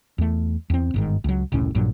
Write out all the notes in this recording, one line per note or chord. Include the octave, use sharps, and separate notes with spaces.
E2 A3
E2 C4
G1 G#2 D#3
C#2 F#3
E1 C2 A2 C#4
A#1 G2 A#2 F#3